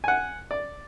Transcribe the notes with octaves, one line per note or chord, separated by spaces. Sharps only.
F#5 G#5
D5